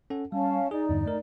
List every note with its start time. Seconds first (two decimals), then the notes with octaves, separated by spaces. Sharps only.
0.10 C#4 A4 F#5
0.32 G3 C#4 F5 A5
0.71 D#4 G#4 D5
0.89 E2 G2 D3
1.06 A3 A#4